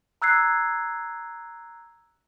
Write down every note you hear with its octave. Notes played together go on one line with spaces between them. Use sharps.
A#5 E6 F#6 G#6 C7